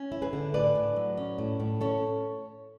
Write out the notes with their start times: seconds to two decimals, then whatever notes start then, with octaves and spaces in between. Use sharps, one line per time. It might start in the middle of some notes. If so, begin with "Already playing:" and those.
Already playing: C#4
0.12 E4
0.22 G#4 B4
0.33 D3
0.54 A2 B4 D5
0.75 A2
0.96 F#3
1.17 C#4
1.38 A2
1.60 A2
1.81 C#4 A4 C#5